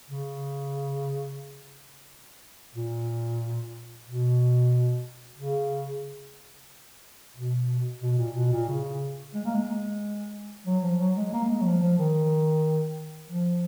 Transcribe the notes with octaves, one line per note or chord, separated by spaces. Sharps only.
C#3
A#2
B2
C#3
B2
B2
A#2
B2
A#2
C#3
G#3
A#3
G#3
F#3
F3
F#3
G#3
A#3
G#3
F#3
F3
F3
D#3
F3